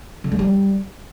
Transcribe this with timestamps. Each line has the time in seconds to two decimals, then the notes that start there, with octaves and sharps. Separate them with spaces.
0.24 D3
0.32 G#3
0.39 G3